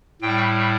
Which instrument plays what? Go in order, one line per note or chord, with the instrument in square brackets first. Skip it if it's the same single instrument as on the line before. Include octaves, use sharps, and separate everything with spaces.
[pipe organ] A2 G3 G5